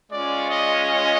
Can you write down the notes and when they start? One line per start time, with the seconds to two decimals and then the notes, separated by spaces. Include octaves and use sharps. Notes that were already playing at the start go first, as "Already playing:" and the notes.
0.11 G#3 C#4 F4 D5
0.49 D#5